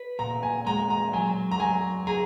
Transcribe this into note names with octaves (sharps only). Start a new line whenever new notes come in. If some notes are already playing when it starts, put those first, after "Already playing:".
Already playing: B4
A#2 A#5
G#5
G#3 A#5
A#5
F#3 G#5
A#5
F#3 G#5
G#4 A#5